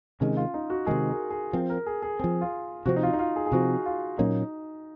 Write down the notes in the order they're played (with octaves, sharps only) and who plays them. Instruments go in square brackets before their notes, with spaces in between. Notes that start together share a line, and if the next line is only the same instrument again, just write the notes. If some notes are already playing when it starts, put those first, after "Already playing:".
[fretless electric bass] C3 D#3 G#3 [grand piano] C#4
[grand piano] F4
D#4
F#4
[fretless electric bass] C3 D#3 G#3 [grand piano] G#4
[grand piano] A#4
G#4
[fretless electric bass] F3 C4 [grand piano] A#4
[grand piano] A#4
G#4
G#4
[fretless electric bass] C4 [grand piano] G#4
[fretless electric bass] F3
[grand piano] F4
[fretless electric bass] C3 F3 C4 [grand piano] F#4
[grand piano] D#4
F4
D#4
F4
G#4
G#4
[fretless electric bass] C3 F3 C4 [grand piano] F#4
[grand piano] F4
[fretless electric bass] A#2 F#3 A#3 C#4 [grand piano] D#4